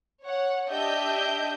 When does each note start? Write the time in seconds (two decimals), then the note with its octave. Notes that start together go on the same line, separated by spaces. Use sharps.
0.23 C#5 F#5
0.69 D4 G4 D#5 E5 G6